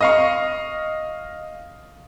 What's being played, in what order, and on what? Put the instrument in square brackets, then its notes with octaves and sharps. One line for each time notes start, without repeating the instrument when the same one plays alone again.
[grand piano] D#5 F5 C#6